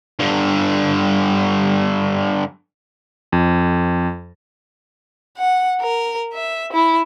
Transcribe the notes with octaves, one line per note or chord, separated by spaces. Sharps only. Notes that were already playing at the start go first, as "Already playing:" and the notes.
G2 D3
F2
F#5
A#4
E5
E4